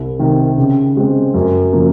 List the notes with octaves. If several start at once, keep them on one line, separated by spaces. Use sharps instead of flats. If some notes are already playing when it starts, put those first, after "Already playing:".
Already playing: C2
C3 D#3
C#3
G#3 C4
F#2
C#3 F3 A#3